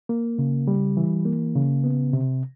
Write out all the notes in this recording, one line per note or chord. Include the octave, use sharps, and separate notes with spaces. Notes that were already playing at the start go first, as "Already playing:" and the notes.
A#3
C#3
G3
E3
A#3
C#3
B3
C3